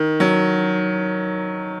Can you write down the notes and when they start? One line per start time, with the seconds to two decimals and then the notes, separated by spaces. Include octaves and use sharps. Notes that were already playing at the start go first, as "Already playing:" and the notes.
Already playing: D#3
0.20 F#3